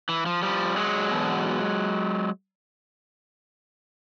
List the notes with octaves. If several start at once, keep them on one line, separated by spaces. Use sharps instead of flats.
E3
F3
F3 G3
F#3 G#3
E2 B2